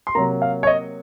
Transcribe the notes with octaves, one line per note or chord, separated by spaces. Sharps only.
C6
C3 F#3 A#3 A#5
F5
C#5
D#5